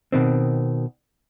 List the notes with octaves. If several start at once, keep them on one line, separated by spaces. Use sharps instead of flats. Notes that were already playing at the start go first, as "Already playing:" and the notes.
B2 D#3 C4